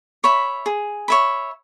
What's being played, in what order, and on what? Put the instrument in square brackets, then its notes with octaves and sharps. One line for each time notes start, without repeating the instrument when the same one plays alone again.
[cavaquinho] C#5 E5 B5
G#4
C#5 E5 B5